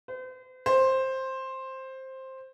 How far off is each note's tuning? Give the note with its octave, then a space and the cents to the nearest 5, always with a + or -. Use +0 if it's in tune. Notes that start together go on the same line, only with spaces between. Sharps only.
C5 -40
C5 +10